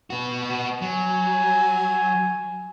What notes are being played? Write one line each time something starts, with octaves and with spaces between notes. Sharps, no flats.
B3 F#4
F#3 G#5